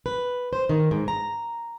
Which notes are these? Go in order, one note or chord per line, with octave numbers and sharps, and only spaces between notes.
B4
C5
D#3
G#2
A#5